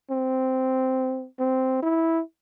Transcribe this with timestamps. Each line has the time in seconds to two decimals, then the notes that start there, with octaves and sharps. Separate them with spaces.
0.10 C4
1.39 C4
1.82 E4